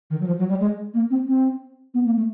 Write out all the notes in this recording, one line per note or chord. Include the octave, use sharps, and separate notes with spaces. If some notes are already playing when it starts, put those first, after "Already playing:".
D#3
F#3
F3
F#3
G3
G#3
A#3
C4
C4
B3
A#3
A3